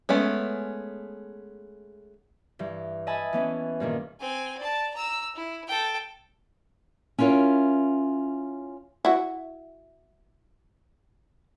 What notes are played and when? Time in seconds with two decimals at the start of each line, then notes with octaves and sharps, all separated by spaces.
0.09 G#3 A3 B3 C#4
2.59 G2 E3
3.07 D#5 E5 G#5 A5 B5
3.33 E3 B3 C#4
3.80 G2 A#2 D#3
4.20 C4 G#5
4.58 D5 A5
4.94 A#5 E6
5.35 E4
5.68 A4 G5
7.18 C#4 E4 F4 A#4 C#5
9.05 E4 F#4